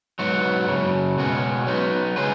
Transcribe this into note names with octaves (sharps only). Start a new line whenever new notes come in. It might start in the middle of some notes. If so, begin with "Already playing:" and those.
G#2 F#3 B3 F#4
F#2 C#3 F#3
B2 G#3 C#4 F#4
F#3 B3 D#4
C#3 G#3 C#4 G#4 B4